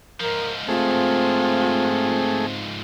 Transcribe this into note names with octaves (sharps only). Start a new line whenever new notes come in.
G#2 F3 A#4
A3 C4 F4 G#4